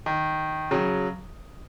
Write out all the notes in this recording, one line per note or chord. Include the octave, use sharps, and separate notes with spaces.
D#3
C#3 F#3